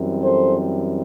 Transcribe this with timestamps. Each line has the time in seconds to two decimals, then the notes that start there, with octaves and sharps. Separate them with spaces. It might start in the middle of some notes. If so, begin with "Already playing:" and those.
Already playing: F#2 E3 G3 C4
0.22 A4 C5